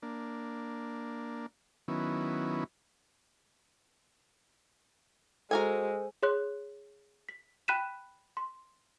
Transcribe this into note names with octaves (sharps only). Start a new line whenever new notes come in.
A#3 D4
D#3 F#3 B3 C#4 E4
G#3 F#4 A4 A#4 C5 G#5
G#4 C#5 C6 F#6
B6
G5 B5 F#6 B6 D#7 E7
C6